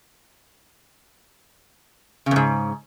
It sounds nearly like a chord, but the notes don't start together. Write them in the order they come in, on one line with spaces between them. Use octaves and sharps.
C#3 E2 G#2